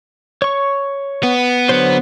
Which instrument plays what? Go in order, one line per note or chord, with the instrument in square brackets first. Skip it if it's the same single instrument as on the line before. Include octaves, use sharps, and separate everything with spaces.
[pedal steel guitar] C#5 C#6
[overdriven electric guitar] B3
[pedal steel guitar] D3 F#3 C5